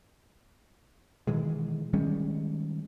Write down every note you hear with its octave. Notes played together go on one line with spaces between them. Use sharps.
B2 D#3 E3 G#3
D#3 G3 G#3 C#4